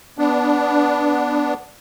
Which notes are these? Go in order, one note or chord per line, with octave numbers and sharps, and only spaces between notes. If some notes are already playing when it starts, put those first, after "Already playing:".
B3 D4